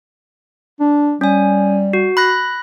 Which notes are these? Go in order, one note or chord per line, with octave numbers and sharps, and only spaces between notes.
D4
G3 C#4 G#5
F#4
B5 F#6 A#6